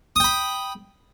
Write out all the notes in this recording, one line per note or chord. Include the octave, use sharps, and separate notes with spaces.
G5 B5 D#6